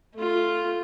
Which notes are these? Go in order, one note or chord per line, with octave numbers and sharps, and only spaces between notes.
A3 F4